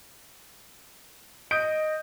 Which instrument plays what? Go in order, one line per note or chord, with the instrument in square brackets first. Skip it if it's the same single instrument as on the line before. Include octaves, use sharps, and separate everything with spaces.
[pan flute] D#5 [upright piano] D#6 G6 D7